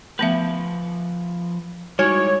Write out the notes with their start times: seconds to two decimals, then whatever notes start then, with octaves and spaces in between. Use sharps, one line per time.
0.19 F3 A3 B3 B4 E5
1.99 G3 G#3 D#4 E4 F#4 C#5 G#5